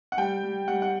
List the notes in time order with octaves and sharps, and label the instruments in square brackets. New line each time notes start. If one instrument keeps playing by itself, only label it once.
[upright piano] F#5
G3 G5
G3
G3 F#5
F#5